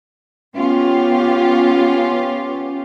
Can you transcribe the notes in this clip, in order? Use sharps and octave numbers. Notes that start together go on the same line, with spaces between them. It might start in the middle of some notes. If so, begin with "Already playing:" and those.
B3 C#4 F4 G4